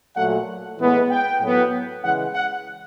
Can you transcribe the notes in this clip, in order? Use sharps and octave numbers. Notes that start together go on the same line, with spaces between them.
A#2 F#3 A3 F#5
A2 E3 G#3 B3
G5
A2 F#3 B3
C#3 E3 G#3 F#5
F#5